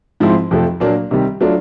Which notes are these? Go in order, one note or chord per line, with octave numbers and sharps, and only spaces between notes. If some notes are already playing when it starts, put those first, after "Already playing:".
G#2 F3 G#3 C4 E4
F2 C3 F3 A3
A#2 F#3 A#3 D4
C3 D#3 G3
F#3 A3 D4 F4